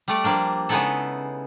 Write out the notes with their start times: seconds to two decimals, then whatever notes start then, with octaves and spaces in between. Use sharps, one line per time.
0.08 G3 A3 D5
0.24 F3 G3 A#3 D4
0.69 C#3 G#3 B3 D#4 E4 A4